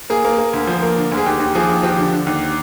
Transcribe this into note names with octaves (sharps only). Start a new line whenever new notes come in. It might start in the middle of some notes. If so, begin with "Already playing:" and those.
A#3 G#4
A#3
A#3
D2
F3
A#3
D3
D2
G#4
D#2 G4
D#2
F3 G#4
D#2
F3 G4
D3
D3
D#2